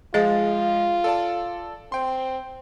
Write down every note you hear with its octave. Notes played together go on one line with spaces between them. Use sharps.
F3 G#3 F4 G#4 D#5 F5 A6
A4 D5 A5
C4 G5 C6